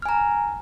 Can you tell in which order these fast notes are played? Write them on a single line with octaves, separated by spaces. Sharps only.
F6 G#5 A#5